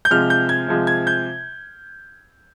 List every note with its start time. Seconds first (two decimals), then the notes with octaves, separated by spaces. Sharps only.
0.05 G6
0.11 C3 F3 G#3 F6
0.30 G6
0.49 G#6
0.68 C3 F3 G#3
0.87 G#6
1.07 G6